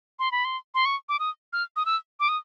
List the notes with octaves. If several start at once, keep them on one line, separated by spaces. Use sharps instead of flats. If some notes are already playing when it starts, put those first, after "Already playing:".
C6
B5
C6
C6
C#6
D6
D#6
F6
D#6
E6
D6
D#6